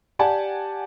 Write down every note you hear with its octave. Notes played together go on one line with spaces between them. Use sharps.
G4 D5 F#5 G#5 A5